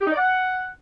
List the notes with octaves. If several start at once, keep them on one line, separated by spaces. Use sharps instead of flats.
G4
D#4
D5
F#5